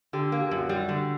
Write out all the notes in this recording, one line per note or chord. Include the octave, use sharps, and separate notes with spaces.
D3 G4
A#3
G4
F#2 F#4
G3
D3